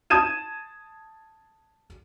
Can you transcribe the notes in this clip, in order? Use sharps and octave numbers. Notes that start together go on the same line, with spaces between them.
A5 D#6 G#6 D#7 E7